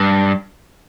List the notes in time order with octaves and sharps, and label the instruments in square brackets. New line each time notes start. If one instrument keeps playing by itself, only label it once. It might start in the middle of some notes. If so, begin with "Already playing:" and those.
Already playing: [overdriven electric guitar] G2